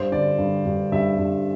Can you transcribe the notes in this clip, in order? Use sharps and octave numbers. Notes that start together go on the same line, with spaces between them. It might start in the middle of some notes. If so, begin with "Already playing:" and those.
Already playing: G2 C5
D3 D5
G2
G2
G2 E5
G2